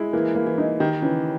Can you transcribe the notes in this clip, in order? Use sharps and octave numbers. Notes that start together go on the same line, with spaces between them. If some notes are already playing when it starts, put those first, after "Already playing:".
Already playing: G#3 E4
E3 A#3
A#3
E3
D#4
D#3 G4
C#3 E3